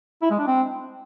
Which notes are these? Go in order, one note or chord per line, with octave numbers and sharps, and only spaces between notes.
E4
G#3
D4
C4